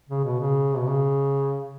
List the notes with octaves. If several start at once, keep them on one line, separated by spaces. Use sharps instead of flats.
C#3
B2
C#3
B2
C#3